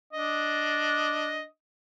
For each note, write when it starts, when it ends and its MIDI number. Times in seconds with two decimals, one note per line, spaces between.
0.13 1.45 62
0.13 1.45 75